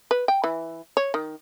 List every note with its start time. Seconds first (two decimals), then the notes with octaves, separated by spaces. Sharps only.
0.11 B4
0.28 G5
0.44 E3
0.97 C#5
1.14 D#3